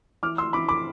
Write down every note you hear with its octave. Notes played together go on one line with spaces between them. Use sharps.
E3 D6 F6
C6 E6
E3 B5 D6
B5 D6